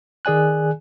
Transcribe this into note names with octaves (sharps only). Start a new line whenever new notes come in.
D#3 G#4 D5 G#5 F#6